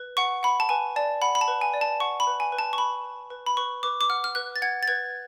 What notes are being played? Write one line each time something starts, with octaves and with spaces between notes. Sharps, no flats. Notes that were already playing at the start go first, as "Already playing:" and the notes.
Already playing: B4
F#5 C#6
F#5 B5
A5
B4 G#5
D5 A5
F#5 B5
B5
A5
B4
G#5
D5
A5
F#5 C#6
B5
B4
G#5
B4
A5
C#6
B4 B5
B4
B4
B5
B4 C#6
B4 D6
D6
F#5 F6
F6
B4 F#6
A6
F#5 G#6
A6
B4 G#6